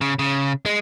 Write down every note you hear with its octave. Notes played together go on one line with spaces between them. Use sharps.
C#3
C#3
G#3